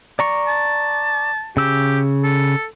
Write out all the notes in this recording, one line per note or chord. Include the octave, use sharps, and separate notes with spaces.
D5 A#5 C#6
A5
C#3 G4 E6
A4